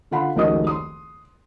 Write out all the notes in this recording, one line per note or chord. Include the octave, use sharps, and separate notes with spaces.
D3 F4 F#5 B5 C6
F1 C#2 D#3 F#4 D#5 D#6
C6 D#6